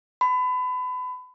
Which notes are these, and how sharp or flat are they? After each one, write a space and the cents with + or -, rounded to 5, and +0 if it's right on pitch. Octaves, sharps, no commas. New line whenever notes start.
B5 +30